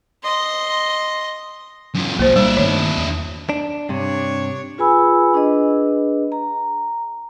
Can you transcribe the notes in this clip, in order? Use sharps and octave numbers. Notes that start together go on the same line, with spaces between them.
D#5 C6
F#2 F4
C2 F3 G#3 A#3 C5
A#2 G3 D4 E4
G2 D#3 A3 C#5
E2
D4
G2 C3 D4 C#5
F4 G#4 B4 G#5 B5 E6
D4 G#4 B4 D#5
A#5